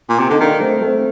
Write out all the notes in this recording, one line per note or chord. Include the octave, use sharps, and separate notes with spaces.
A#2
C3
D3 D#4
D#3 A#3 D4
A3 C4
A3 C4